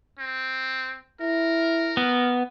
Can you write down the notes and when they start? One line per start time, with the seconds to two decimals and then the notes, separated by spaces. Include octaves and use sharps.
0.19 C4
1.21 E4 A#4
1.97 B3